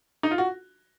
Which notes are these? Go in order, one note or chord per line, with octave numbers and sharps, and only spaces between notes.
D#4
F4
F#4